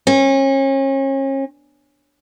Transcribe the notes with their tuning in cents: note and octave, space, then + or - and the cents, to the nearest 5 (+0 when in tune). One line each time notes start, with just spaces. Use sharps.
C#4 -35